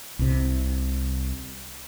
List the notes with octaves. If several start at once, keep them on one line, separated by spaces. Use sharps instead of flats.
C2 C3